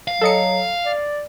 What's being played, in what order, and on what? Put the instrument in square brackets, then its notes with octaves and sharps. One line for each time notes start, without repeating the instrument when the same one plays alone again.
[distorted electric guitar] F5
[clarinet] F#3 [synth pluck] A4 D#5 C#7
[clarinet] D5